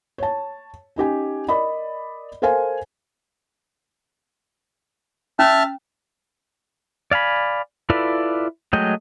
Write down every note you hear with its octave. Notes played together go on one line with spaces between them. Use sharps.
C#5 A5
C#4 D#4 G4 G#5
A#4 D5 D#5 B5
A4 A#4 C5 F5 G#5
C#4 E5 A5 F6
D5 F5 G#5 B5
E4 F4 A4 B4 D5
F#3 G#3 A3 D#5 G5